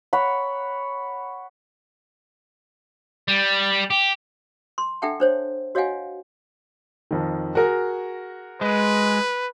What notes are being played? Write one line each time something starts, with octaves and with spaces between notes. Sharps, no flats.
C#5 F#5 B5
G3
G4
C6
D4 A4 E5 F#5 G5 A5
D4 C5 C#5
F#4 C#5 D#5 F5 F#5 G#5
F2 D#3
F#4 G#4 A#4
G#3 B4